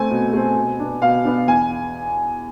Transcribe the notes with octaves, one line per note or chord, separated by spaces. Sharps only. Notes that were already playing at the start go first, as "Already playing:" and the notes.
Already playing: A3 C4 G#5
B2
A3 C4
B2
B3 D4
B2 F5
B3 D4
E2 G#5